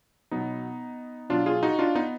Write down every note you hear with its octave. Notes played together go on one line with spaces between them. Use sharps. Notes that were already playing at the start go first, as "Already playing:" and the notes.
B2 F#3 B3 D#4
B2 F#3 D4 F4
F4 G#4
D#4 F#4
D4 F4
B3 D#4